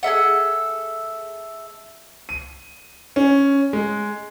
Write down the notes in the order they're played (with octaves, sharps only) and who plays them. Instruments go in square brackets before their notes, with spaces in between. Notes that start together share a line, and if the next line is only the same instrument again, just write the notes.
[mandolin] G#4 A4 E5 F#5
[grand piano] D#7
C#4
G#3